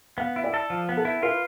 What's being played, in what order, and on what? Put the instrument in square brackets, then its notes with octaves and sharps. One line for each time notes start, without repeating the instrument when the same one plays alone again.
[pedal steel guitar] B3 [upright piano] F5
[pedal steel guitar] E4
[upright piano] D5
[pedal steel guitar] A4
F3
B3
[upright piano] A4
[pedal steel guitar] E4
[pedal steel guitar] F4 [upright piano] B4